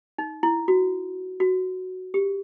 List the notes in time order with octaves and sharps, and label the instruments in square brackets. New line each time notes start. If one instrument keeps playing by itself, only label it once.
[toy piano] D#4
E4
F#4
F#4
G4